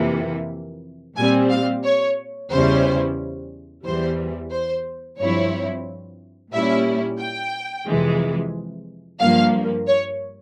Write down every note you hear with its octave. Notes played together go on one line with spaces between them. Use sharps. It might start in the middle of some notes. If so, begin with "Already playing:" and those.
Already playing: F2 C3 E3 A#3
A#2 G3 C4 G#5
F5
C#5
E2 C#3 G3 C#4 E4 C5
E2 E3 G3 C5
C5
G2 F3 C4 E4 C#5
A#2 G3 C#4 E4 E5
G5
F2 C3 E3 G#3
G2 F3 A#3 F5
C#5